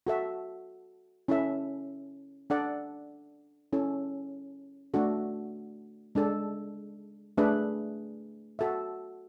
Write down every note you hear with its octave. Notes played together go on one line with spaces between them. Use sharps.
F#4 A4 E5
C#4 E4 A4 E5
D4 A4 D5 F#5
C#4 E4 A4
A3 D4 F#4 A4
G#3 D4 A4
A3 D4 G#4 B4 E5
F#4 A4 E5